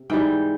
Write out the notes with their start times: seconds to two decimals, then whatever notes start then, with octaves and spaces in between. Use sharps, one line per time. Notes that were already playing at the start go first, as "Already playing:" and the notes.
Already playing: C3
0.10 G#2 E3 G3 G5